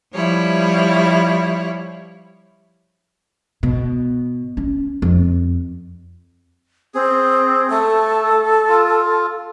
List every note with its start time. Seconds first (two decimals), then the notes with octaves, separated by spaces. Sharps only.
0.14 F3 G3 E4 C#5
3.63 B2
4.57 C#4
5.02 F2
6.94 C4 G#4
7.70 A3 A4
8.69 F4